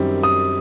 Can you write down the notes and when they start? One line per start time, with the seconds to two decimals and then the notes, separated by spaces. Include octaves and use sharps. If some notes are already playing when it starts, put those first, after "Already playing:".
Already playing: F#2 D#3 G3 C4
0.23 D#6